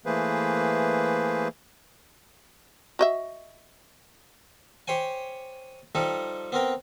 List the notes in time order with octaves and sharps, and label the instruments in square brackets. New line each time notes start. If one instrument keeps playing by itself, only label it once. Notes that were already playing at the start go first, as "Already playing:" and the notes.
[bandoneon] E3 A3 A#3 G#4 B4 C5
[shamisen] F#4 D#5 E5
[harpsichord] G4 C5 C#5 G5 G#5
F3 G3 D#4 G4 A4
B3 C4 A#4 G5